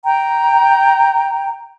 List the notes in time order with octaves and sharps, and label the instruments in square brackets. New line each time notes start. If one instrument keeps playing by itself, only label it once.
[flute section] G5 A#5